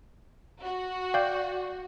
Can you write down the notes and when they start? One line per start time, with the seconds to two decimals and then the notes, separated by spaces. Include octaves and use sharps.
0.63 F#4
1.14 D5 F5 G5 G6